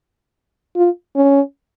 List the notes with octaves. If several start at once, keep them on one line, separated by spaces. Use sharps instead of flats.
F4
C#4